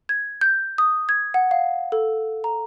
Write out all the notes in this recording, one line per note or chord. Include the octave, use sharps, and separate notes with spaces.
G#6
G6
D#6
G#6
F#5
F5
A4
A#5